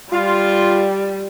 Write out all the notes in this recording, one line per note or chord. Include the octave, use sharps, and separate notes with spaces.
G3 F4